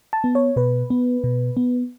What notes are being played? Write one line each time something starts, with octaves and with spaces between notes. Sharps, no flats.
A5
B3
C#5
B2 B4
B3
B2
B3